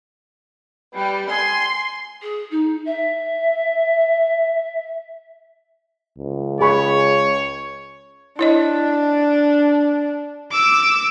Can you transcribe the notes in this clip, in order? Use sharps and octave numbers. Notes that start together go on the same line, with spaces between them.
G3 B4
G#5 C6
G#4
D#4
E5
C#2
G#4 C#5 B5 C#6
D4 E4 C#5 D#5
D6 E6